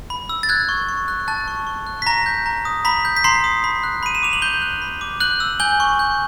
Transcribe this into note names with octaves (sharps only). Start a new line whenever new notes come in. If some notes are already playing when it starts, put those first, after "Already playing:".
B5
E6
A6
F#6 G#6
C#6
C#6
F#6
A5 F#6 A6
C#6
C#6
F#6
B6
A#5 A#6
G6
A#5
D#6
A#5 B5 B6
G6
B6
A#5 C6 C7
D#6
B5
F#6
B5 D#7
E7
D6 F7
F#7
B5 G6 G7
F#6
B5
D6
F#6 G6 F#7
E6
G#5 G6 G7
C#6
G6